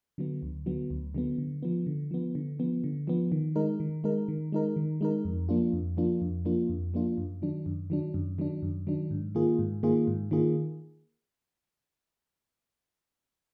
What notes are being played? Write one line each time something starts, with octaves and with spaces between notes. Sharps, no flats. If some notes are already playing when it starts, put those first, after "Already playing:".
D3 F#3 B3
D2
D3 F#3 B3
D2
D3 F#3 B3
D3
F3 B3
D3
F3 B3
D3
F3 B3
D3
F3 B3
D#3
G#3 D#4 A#4
D#3
G#3 D#4 A#4
D#3
G#3 D#4 A#4
D#3
G#3 D#4 A#4
F2
F3 A#3 D4 F4
F2
F3 A#3 D4 F4
F2
F3 A#3 D4 F4
F2
F3 A#3 D4 F4
F#2
D#3 F#3 D4
F#2
D#3 F#3 D4
F#2
D#3 F#3 D4
F#2
D#3 F#3 D4
G#2
D#3 A#3 F4 G#4
G#2
D#3 A#3 F4 G#4
G#2
D#3 A#3 F4 G#4